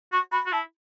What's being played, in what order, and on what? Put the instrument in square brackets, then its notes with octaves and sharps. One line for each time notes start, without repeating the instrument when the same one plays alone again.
[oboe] F#4 [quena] C#6
[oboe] F#4 [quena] B5
[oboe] F#4
[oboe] E4 [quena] A5